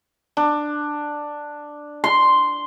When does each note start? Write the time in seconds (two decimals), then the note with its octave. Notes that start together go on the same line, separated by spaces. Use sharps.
0.37 D4
2.04 C6